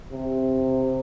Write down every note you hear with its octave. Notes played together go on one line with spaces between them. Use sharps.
C3